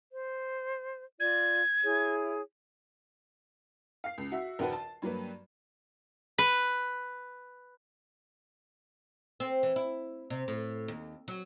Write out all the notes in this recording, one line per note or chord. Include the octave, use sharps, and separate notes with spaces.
C5
F4 D5 G#6
E4 G#4 C#5
F5 C7
C#2
F#4 E5
A#1 D#2 D#3 F#4 B4 A5
A5
G2 F#3 A#3 B4
B4
C4
E3
E4
C3
A2
D#2
F#3